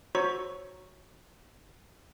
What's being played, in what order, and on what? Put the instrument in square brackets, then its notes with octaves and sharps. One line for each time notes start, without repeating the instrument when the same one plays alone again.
[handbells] F#4 C5 C#5 A#5 C#6 E6